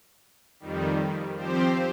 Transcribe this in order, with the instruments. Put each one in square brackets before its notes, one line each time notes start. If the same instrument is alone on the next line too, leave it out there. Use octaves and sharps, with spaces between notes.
[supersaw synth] F2 D#3 G3
F3 C4 G4 C5